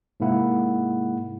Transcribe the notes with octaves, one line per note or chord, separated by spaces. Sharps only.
G#2 C3 G#3 A#3 E4 F#5